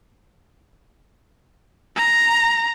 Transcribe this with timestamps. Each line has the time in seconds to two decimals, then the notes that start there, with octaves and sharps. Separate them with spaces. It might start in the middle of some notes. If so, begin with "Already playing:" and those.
1.96 A#5